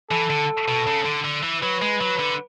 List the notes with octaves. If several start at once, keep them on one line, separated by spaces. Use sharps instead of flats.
E3 A4
D3
B2
C#3
D3
D3
E3
F#3 B4
G#3
F#3
D3